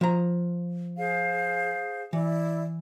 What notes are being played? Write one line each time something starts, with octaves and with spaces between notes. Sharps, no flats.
F3 A#5
G#4 C5 F5
E3 E4 D5